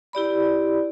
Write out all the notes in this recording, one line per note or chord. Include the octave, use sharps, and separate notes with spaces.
E4 G4 D5 B5